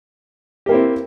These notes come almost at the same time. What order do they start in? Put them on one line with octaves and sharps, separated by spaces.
G4 A#3 E4 C4